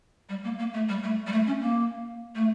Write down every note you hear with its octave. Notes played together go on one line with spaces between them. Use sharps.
G3
A#3
A#3
A3
G3
A3
G3
A3
C#4
A#3
A3